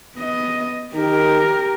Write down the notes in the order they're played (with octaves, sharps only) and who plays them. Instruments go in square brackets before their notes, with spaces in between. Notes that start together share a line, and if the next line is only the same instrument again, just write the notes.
[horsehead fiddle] B3 D#5
[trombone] D#3 [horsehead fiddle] G4 A#4